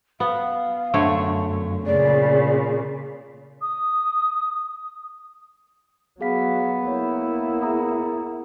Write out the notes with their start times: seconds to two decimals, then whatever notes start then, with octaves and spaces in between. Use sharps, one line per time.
0.20 B3 F5
0.94 F#2 D3 A3 C#5
1.86 A#2 C#3 D5
3.62 D#6
6.21 F#3 B3 G#4 F5 B6
6.87 A#3 E4 C#5
7.62 G#4 A#5 D#6